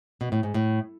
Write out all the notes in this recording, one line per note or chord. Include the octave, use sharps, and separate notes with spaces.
B2
A2
G#2
A2